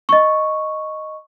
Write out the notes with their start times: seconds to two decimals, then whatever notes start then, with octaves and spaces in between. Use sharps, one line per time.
0.09 D#5 C#6